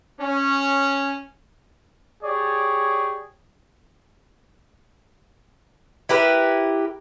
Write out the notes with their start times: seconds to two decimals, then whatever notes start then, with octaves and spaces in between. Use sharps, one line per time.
0.20 C#4
2.23 G4 G#4 C#5 D5
6.09 E4 G4 A#4 B4